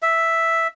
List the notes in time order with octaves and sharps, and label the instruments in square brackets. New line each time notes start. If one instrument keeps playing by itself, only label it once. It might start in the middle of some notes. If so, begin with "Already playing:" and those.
[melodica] E5